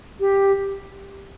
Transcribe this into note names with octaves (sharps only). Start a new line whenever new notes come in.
G4